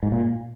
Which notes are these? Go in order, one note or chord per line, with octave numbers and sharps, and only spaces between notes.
G#2
A#2